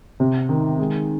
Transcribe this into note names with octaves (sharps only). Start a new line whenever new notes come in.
C3
D#3
G#3